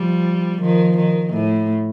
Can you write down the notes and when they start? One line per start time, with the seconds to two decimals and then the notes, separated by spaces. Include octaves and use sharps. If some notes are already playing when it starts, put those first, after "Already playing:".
Already playing: F3 G3
0.61 D#3 F3
0.97 D#3
1.33 A2